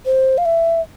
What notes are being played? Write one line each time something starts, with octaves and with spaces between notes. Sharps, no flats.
C5
F5
E5